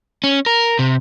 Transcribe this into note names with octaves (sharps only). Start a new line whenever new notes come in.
C#4
A#4
C3